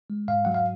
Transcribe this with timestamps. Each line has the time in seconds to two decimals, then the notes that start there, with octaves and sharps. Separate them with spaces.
0.10 G#3
0.28 G#2 F5
0.45 F#3 F#5
0.54 F5